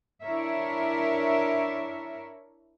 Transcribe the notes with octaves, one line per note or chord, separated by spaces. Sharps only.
D4 E4 A#4 C#5 E5